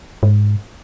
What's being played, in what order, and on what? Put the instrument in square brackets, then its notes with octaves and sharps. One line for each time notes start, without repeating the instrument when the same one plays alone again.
[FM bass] G#2